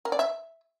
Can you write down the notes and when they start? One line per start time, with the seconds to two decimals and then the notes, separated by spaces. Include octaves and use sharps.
0.05 A#4
0.12 D5
0.19 E5